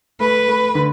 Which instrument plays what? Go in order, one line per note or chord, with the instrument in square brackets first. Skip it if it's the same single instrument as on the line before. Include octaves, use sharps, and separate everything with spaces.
[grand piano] A3 [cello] B4
[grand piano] A3
D3